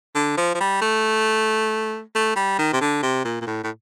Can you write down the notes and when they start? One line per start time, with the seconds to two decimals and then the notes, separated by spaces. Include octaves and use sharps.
0.15 D3
0.37 F3
0.55 F3
0.60 G3
0.82 A3
2.15 A3
2.36 G3
2.58 D#3
2.73 C3
2.81 D3
3.03 C3
3.25 A#2
3.41 A#2
3.47 A2
3.64 A2